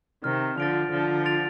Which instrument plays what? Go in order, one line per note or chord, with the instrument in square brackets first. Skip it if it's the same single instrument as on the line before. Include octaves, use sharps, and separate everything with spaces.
[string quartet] C3 D#3 [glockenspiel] F6
[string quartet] D3 F3 [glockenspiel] A6 D7 F7
[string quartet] D3 F3 [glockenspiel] F6
[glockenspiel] A6 D7 F7